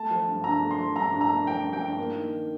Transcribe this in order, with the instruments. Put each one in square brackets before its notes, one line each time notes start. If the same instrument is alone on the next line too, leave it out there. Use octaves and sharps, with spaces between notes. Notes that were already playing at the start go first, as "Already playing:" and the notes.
Already playing: [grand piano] A3 A5
F3
G2
D4 A#5
A3
C6
F3
G2 A#5
D4
A#5
A3
F3 G5
G2
G5
D4
A#3
D#3